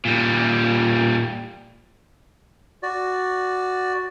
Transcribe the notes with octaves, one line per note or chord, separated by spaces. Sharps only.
A#2 G3
F#4 D5